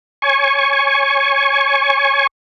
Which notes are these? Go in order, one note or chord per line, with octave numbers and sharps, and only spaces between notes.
C#5 G#5 C#6